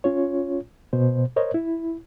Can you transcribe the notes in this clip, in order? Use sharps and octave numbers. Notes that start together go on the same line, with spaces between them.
C#4 F4 C#5
B2 C5
A#4 C5 C#5 D#5
E4